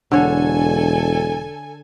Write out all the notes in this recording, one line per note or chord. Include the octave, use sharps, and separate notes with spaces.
E1 D3 A4 C#5 G#5